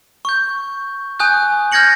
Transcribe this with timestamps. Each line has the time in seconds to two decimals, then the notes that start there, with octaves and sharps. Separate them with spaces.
0.25 C#6 G6
1.20 G#5 D#6 F#6 G6
1.72 F6 G6 G#6 A#6 C#7 F#7